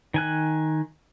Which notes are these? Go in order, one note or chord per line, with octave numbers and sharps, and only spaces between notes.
D#3 G#5 F#6